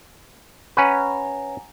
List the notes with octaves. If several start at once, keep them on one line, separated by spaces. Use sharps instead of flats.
C#4 B4 F#5 G#5 A#5